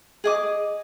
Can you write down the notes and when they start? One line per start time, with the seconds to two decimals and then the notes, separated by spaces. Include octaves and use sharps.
0.24 G#4 D#5 D6